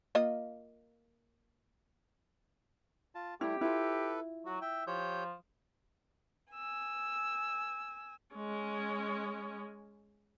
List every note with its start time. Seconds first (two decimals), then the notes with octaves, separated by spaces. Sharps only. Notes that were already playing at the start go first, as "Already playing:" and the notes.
0.15 A#3 F4 D#5
3.15 F4 A5
3.41 G3 A3 E4 G4
3.61 E4 F4 A4 B4
4.46 F#3 F#4
4.62 E5 G5
4.87 F3 G4 C#5 G6
6.54 G#5 E6
8.35 G#3 C#4